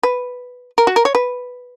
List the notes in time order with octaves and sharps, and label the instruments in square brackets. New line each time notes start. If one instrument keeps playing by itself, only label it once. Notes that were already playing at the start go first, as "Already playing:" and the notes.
[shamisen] B4
A#4
F#4
A#4
C#5
B4